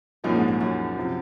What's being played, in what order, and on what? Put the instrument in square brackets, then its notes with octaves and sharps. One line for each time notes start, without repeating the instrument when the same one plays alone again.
[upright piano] C2 A#2 F3 A#3 D#4 [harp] F#2
[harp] G#2
F#2
F#2
[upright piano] C3 F3